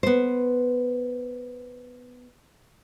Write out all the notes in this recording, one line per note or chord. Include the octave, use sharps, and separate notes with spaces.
B3 C5